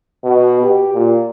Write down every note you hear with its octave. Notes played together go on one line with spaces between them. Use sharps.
B2
G4
A#2